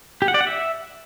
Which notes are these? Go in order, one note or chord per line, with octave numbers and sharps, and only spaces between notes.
G4
F#5
D5
F#5
E5